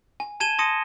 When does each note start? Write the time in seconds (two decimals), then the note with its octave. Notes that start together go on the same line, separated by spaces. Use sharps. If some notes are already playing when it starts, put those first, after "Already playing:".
0.20 G#5
0.40 A5 G#6 D#7 E7 G7
0.59 A5 C6 D#6 A#6 C#7 D#7